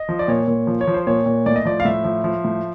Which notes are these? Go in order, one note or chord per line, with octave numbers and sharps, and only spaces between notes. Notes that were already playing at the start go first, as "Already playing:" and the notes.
Already playing: D#5
F3
D5
A#2 C#5
A#2
F3
C#5
F3
C5
A#2 C#5
A#2
A2 D5
D#5
F3 D5
F5
A2 E5
F3
F3
A2